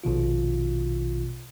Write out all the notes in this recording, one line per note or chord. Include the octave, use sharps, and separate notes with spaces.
A#1 B2 D#3 F4